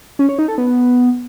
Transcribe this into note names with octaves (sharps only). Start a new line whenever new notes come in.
C#4
C#5
D#4
A4
B3